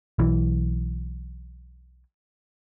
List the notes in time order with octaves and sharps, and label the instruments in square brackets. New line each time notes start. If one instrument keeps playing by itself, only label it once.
[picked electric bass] B1 E3